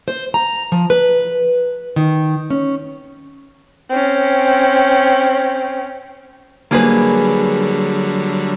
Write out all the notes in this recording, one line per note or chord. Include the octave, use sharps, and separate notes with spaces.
C5
A#5
F3
B4
D#3
C#4
C4 C#4
D3 F#3 G3 A#3 G#4 B4